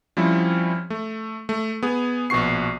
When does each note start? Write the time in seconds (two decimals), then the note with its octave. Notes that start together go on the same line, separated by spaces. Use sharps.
0.17 F3 G3 C4 C#4 E4
0.90 A3
1.49 A3
1.83 B3 G#4
2.30 A#1 B2 F#4 C#6 C7